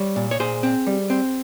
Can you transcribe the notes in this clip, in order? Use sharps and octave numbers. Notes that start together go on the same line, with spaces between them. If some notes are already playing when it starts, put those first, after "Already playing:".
Already playing: G3 C#5
A#2
C#5
A#2 G#4 C5
C4
G3
C4